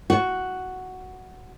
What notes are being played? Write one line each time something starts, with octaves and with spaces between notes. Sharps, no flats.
F#4